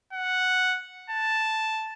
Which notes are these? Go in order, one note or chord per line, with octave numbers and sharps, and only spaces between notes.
F#5
A5